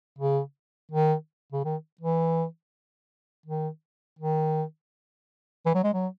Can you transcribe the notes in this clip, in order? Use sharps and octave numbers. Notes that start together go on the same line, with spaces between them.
C#3
D#3
C#3
D#3
E3
D#3
D#3
E3
F#3
G#3
F#3